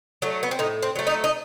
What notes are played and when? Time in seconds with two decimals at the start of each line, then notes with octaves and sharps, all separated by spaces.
0.22 F#3 A3
0.43 B3
0.51 C4
0.59 A2 D#4
0.83 C4
0.96 F#3 A3
1.07 D#4
1.24 D#4